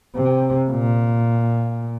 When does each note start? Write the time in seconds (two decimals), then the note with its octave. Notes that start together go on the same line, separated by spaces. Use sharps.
0.15 C3
0.70 A#2